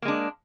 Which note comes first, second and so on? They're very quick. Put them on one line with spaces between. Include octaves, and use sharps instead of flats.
A#3 G#3 D4